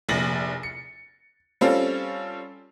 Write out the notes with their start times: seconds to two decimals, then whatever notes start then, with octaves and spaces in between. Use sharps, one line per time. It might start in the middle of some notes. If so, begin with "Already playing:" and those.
0.09 F1 A#1 A6 A#6 F#7
0.63 C#7
1.61 G3 C4 C#4 F4 A4